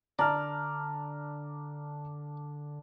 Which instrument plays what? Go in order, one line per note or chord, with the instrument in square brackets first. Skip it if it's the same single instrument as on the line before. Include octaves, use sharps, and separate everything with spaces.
[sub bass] D3 [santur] D4 [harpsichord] D5 [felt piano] A#5 F6